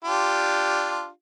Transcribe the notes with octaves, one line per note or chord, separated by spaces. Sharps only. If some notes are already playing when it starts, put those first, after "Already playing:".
D4 F4 G4